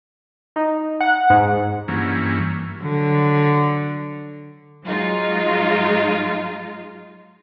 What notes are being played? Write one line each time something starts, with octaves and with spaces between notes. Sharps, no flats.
D#4
F#5
G#2
G2 E3 A#3 C#4
D3 F#3
G#2 F#3 G#3 D#4 F4